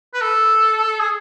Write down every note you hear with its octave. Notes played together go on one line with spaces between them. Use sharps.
B4
A4
G#4